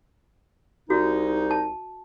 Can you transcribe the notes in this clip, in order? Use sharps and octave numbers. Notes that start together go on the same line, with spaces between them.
C2 D#4 F#4
A5